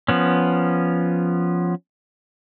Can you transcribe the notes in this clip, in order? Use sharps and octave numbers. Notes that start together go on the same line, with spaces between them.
F3 B3 C#4